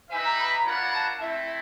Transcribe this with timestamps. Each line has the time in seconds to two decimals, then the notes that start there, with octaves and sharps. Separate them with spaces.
0.11 D#4 G4 B4 E5 G#5
0.24 A#5
0.38 B5
0.53 A#5
0.65 D4 F4 A#4 C#5 F#5 B5
0.93 A5
1.20 A3 C4 E4 E5